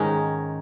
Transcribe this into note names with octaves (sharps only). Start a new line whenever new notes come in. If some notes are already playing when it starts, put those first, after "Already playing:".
Already playing: G#2 D#3 G#3 C#4 D#4